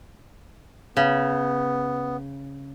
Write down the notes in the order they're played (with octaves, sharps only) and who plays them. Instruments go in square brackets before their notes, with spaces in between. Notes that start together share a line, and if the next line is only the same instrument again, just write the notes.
[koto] C#3 [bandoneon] B3